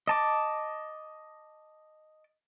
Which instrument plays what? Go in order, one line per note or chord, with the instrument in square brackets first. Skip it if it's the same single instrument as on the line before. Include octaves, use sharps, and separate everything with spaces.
[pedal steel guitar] D#5 A5 D6